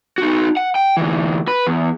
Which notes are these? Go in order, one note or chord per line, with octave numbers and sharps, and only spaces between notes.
D#4 F#4
F#5
G5
D2 E3
B4
E2